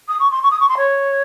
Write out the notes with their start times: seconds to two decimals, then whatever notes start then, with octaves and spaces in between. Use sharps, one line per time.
0.08 D#6
0.20 C#6
0.31 C6
0.43 C#6
0.51 D#6
0.60 C#6
0.69 C6
0.77 C#5